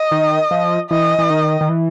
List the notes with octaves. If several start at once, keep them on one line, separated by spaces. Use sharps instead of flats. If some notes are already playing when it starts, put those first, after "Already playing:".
Already playing: D#5
D#3
F3
E3 D#5
E3
D#3
D#3
E3